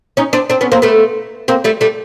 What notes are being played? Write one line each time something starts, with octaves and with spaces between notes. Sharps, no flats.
C#4 D#4
C4 D4
C4 D4
B3 C#4
A#3 C4
A3 B3
A#3 C4
G3 A3
G3 A3